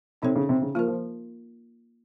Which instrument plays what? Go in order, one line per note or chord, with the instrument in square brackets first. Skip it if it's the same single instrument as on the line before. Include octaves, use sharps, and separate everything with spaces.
[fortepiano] C3 [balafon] C4 D#4 A4 C#5
[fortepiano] C#3
C3
C#3
[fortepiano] F3 [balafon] A#3 F4 A#4
[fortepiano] F3